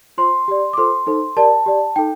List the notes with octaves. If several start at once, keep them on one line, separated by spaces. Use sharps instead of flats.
F4 C5 C6
G4 D5
D6
F4 A4 C5 C6
D#4 A4 C5
G4 A#4 D5 A5
G4 D5
D#4 A4 G5